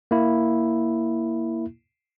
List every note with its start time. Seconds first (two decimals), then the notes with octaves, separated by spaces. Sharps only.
0.11 A#3 E4